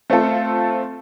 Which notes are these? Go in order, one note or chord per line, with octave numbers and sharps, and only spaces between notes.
A3 C4 F4 A4